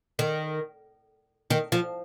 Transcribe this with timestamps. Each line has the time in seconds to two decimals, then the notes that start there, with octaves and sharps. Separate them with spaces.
0.19 D#3
1.50 D#3
1.72 F3